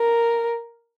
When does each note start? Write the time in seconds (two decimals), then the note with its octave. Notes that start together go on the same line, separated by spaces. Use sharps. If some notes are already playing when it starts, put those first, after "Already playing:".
Already playing: A#4